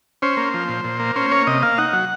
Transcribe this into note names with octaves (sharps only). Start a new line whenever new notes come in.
C#4 C5
A#3
F3
A#2
A#2
A#3
C#4 C5
A#3 C#5
C3 D#5
A#3 F5
D#4 F#5
F#3